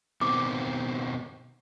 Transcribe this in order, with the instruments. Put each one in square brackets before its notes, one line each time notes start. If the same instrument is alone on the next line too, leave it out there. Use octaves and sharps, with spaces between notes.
[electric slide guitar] B2 D#3 C4 [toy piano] D6